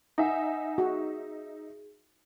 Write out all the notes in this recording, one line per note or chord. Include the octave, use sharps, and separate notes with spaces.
D#4 E5 F#5 G#5
F#4 G#4